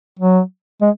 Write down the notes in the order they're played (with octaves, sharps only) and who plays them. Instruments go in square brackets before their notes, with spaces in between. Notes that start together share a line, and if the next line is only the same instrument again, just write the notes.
[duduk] F#3
G#3